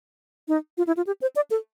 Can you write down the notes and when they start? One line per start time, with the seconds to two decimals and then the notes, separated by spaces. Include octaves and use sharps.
0.48 D#4
0.78 F4
0.87 E4
0.97 F4
1.07 G4
1.22 C5
1.36 D5
1.51 A4